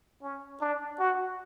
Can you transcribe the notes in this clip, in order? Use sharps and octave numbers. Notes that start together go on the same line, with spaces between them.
C#4
D4
F#4